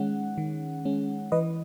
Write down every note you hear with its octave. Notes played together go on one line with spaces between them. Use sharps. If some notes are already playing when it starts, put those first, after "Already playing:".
Already playing: D#3 G#3 C#4 F#5
D#3
G#3 C#4
E3 B4 D#5